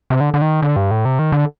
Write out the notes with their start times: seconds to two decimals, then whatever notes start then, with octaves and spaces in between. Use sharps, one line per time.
0.10 C3
0.21 D3
0.34 D3
0.42 D#3
0.62 D3
0.76 G2
0.91 A2
1.05 C3
1.19 D#3
1.32 D3